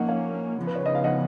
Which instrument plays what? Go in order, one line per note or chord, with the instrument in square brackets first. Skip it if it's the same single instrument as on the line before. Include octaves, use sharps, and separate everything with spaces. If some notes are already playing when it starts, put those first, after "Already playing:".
Already playing: [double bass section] F3 A#3 C#4 [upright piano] D#5 F#5
[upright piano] C#5 F5
[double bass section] C#3 F3 B3
[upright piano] B4
C#5
D#5
F5
D#5 F#5